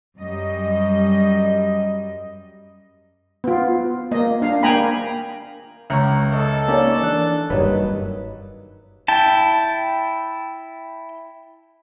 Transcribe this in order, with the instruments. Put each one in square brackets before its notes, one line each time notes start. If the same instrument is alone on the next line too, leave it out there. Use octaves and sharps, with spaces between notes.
[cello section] F#2 G3 D#5
[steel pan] B3 F4
A#3 D#5
D4 F5
A#3 G5 G#5 A#5 B5
[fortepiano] C#2 A#5 [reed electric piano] E5 C#6
[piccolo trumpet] A4 [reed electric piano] D#5
[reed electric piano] A#3 C#4 D#4 [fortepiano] D5
[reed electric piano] E3 D4 F#6
[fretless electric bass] F#1 G2 [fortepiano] D#3 F#3 [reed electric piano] B4 D#5
[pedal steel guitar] E4 G5 A5